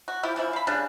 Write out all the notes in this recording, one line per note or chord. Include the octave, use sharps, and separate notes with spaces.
F#4
F3 E4 G4
E3 F3 C#4 E4
F5 B5
C#3 G3 D4 B4